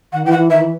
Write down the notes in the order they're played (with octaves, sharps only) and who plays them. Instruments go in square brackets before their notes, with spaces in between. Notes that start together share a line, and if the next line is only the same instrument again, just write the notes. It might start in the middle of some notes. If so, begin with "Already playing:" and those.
[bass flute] D#3 [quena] F#5
[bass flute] E3 [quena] G5
[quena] F#5
[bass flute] E3
[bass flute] D#3 [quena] E5
[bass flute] E3